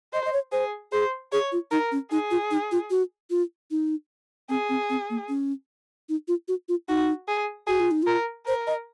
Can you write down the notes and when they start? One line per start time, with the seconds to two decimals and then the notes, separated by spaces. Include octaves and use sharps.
0.13 C5 D#5
0.26 D#5
0.32 C#5
0.52 G#4 C5
0.92 G#4 C5
1.32 G#4 C#5
1.52 F4
1.71 D#4 A#4
1.92 C#4
2.11 D#4 G#4
2.31 F4
2.51 D#4
2.71 F4
2.90 F#4
3.30 F4
3.71 D#4
4.49 C4 G#4
4.69 C4
4.90 C4
5.10 A#3
5.29 C#4
6.09 D#4
6.28 F4
6.48 F#4
6.68 F4
6.89 D#4 F#4
7.28 G#4
7.67 F#4 G#4
7.80 F4
7.91 D#4
8.03 F4 A#4
8.46 A#4 C5
8.67 D#5